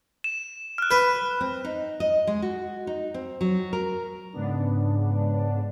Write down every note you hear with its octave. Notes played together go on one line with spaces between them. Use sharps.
E7
F6 F#6
B4
C4
D#4
D#5
G#3
F#4
D#4
C4
F#3
A#4
G#2 C#3 B3 D4